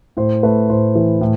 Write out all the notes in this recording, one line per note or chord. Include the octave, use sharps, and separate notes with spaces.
A2 C5
A3 B4
A2 C5
E3
A2